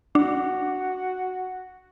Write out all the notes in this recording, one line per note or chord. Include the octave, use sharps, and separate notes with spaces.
D4 F#4